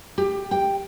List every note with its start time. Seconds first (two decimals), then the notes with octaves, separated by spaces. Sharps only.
0.18 G4
0.51 G5